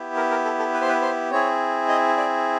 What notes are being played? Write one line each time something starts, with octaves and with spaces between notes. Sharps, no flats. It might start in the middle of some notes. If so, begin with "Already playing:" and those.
Already playing: B3 E4 G4
A#4
A#4
A4
A4
B4
C5
B4
C5
C4 E4 G#4 C#5
D#5
D5